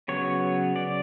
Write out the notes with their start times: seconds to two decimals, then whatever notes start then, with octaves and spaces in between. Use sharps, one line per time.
0.08 C#3 F#3 B3 C#5
0.76 D5